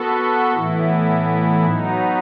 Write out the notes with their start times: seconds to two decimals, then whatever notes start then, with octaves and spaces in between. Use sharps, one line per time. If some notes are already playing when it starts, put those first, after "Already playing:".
Already playing: B3 F#4 A4
0.53 A2 E3 B3 E4
1.65 F#3 B3 D#4